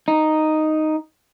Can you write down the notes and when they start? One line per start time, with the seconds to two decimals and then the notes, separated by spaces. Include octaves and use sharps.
0.08 D#4